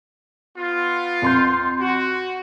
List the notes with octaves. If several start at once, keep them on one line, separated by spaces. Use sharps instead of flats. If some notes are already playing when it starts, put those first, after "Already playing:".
B3 F4
F2 C6 G6
F#4